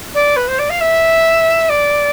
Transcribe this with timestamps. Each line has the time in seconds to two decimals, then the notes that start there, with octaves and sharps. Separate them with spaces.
0.14 D5
0.36 B4
0.47 C5
0.58 D5
0.69 F5
0.80 E5
1.69 D5